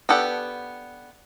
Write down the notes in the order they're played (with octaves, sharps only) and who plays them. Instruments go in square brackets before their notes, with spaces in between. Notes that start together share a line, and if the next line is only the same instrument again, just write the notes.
[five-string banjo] B3 D4 G4 A4 F#5